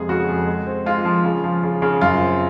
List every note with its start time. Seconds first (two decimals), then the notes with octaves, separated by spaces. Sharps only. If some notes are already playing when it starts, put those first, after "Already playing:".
Already playing: F2 C3 G#3 G#4
0.09 C#3 F#4
0.28 F2
0.47 G#3
0.67 C4
0.86 G#3 F4
1.05 F3
1.24 C#3
1.44 F3
1.63 C#3
1.82 C#3
2.01 F#2 F4
2.21 C4